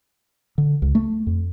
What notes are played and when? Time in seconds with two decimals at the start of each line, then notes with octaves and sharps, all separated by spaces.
0.58 D3
0.82 C#2
0.95 A3
1.27 F2